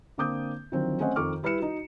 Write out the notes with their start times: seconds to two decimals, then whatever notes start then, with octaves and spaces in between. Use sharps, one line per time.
0.18 D3 A#3 C4 D6 D#6 G6
0.72 D3 D#3 F3 F#3 C4
1.00 A3 C4 C#4 C5 D#5 F#5
1.16 F2 D#3 A4 C#6 D6 F6
1.43 G3 E4 B4 F6 C#7 E7
1.59 D#4 F#4